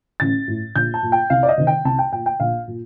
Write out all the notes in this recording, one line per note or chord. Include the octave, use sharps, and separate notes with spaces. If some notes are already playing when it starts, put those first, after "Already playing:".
A1 A6
A2
A#1 G6
A5
A#2
G5
C2 F5
D5
D#5
C3 D#3
G5
C2 A5
G5
A#2 G5
G5
A#1 F5
A#2